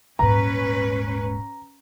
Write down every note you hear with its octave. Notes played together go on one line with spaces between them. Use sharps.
D#1 G#2 C#4 B4 A#5